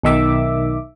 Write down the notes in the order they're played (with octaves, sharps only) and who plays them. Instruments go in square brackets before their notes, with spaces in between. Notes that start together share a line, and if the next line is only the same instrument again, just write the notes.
[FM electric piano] B1 D#3 E5 D6